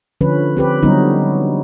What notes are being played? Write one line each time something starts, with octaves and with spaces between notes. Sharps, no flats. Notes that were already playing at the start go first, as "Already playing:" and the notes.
D3 F3 C#4 B4
C4 G4 B4
D3 F#3 G3 B3 C#4 D#4